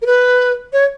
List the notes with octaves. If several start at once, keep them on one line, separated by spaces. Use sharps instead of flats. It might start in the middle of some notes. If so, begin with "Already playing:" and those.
A#4
B4
C#5